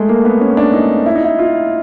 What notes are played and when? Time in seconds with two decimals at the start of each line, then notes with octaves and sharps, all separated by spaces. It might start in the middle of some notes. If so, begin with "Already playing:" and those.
Already playing: G#3 A3
0.09 A#3
0.25 B3
0.41 C#4
0.57 D4
0.74 D#4
1.06 E4
1.15 D#4
1.24 E4
1.39 F4